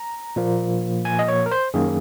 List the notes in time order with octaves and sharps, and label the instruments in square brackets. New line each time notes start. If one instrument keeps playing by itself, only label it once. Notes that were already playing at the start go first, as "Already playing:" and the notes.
Already playing: [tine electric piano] A#5
A#2 F3 A#3
G#5
D#5
C#5
A#4
C5
F#2 D#3 A#3 G#4